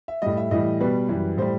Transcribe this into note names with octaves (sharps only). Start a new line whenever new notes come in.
E5
A2 G3 D#5
E5
A2 E3 G3 D#5
B2 G3 B4
F#2 E3 G3
A2 G3 C5